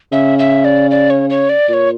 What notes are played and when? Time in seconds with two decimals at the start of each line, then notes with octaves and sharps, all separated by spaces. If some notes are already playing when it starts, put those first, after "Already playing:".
0.12 C#3 E5
0.39 E5
0.65 D5
0.91 D5
1.10 C#5
1.30 C#5
1.49 D5
1.68 A#2 C#5 D5